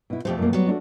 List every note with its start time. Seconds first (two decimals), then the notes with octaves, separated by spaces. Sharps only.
0.10 B2 E4
0.25 F2 B2 A3 G4 C5
0.38 F#2 A#3
0.53 F#3 G3 B3
0.67 A3 D4 F#4